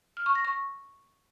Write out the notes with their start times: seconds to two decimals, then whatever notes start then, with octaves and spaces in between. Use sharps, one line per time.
0.17 F6
0.26 C#6
0.35 A#6
0.45 C#6